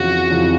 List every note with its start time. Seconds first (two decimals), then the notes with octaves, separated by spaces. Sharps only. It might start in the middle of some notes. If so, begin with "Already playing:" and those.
Already playing: F2 C#3 E3 F#4
0.31 F2 C#3 E3